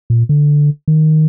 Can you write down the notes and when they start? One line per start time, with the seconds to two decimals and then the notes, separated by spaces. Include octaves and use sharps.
0.10 A#2
0.29 D3
0.88 D#3